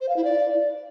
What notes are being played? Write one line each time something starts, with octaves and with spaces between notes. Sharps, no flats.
C5
F5
E4
D5